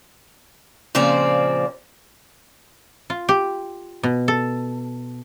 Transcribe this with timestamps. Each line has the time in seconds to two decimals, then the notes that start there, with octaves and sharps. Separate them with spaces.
0.95 A#2 C#3 F3 C4 D5
3.10 F4
3.29 G4
4.03 B2
4.28 A4